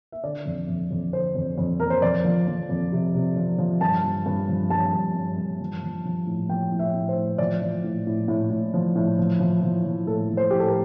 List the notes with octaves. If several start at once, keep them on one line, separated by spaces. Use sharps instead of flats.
E5
D3 D5
F2
F2
F2
D3 C5
F2
F2
F2 A#4
C5
F2 D5
F3
F3
F2
C3
C3
F3
F3
G2 A5
F3
G2
F3
G2 A5
G2
G2
G2
F3
F3
F3
A2
F3 G5
A2
E5
A2
C5
A2
F3 D5
F3
A2
A2
A2
A2
F3
A2
F3
F3
F3
F3
A2 A4
F3
C5
A2 G4
A4
A#4